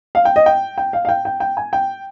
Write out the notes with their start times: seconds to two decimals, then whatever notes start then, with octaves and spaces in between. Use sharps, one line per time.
0.15 F5
0.25 G5
0.36 D#5
0.46 G5
0.78 G5
0.93 F5
1.05 F5
1.09 G5
1.25 G5
1.40 G5
1.57 G#5
1.73 G5